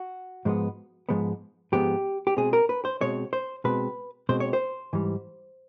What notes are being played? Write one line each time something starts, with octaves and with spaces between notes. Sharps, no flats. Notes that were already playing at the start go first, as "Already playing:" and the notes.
Already playing: F#4
G#2 F3 G#3 B3
G#2 F3 G#3 B3
G#2 F3 G#3 B3 G4
G4
B2 G#3 C4 G#4
A#4
B4
C5
B2 G#3 C4 C#5
C5
B2 G#3 C4 B4
B2 G#3 C4 C5
C#5
C5
G#2 E3 G3